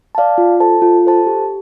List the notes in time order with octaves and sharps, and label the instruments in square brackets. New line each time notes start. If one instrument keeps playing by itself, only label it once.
[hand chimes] D5 F5 A5
F4
A4 C5 A5
F4
A4 C5 A5
G4